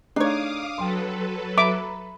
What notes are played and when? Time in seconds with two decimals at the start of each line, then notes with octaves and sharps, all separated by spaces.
0.16 A3 D4 D#4 G#4 C#5 F5 D6 D#6
0.78 F#3 A4 B4 G5 C6
1.58 E5 A#5 B5 D6